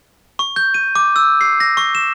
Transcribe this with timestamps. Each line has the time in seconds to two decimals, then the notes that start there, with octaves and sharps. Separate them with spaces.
0.39 C#6
0.56 G6
0.74 D#7
0.95 D6
1.16 E6
1.41 C7
1.60 A#6
1.77 C#6
1.95 E7